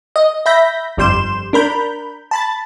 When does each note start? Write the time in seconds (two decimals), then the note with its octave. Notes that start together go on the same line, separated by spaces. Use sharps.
0.16 D#5
0.46 E5 B5 G6 A#6 B6
0.97 G1 F2 G3 C6 G6 E7
1.53 D4 A#4 B5 G6
2.31 A5 B5 A6